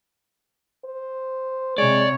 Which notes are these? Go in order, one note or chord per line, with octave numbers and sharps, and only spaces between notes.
C5
C3 G#3 C#5 D5